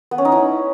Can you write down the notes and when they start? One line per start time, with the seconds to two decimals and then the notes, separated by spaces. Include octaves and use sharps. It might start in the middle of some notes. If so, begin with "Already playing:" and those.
0.11 B3
0.18 C#4
0.25 D#4
0.32 E4